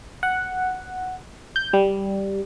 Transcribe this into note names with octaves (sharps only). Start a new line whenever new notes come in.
F#5
G6
G3